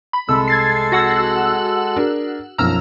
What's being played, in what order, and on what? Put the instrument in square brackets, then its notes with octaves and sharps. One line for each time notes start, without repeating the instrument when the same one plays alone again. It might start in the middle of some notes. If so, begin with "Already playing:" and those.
[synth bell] B5
[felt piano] C2 [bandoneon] G#3 A4 [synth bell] E6
[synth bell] G#6 A6 C7
F#4 F#5 E6
[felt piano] D4 G#4 A#4
[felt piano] B1 F#2 F3 [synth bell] A#5 E6 F6